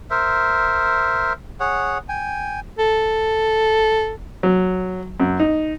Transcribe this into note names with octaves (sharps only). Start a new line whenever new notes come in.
A#4 C5 E5
G#4 C#5 F#5
G5 G#5
A4
F#3
F#2
D#4